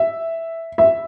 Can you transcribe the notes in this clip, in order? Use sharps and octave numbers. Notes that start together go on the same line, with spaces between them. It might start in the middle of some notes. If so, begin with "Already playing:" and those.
Already playing: E5
E5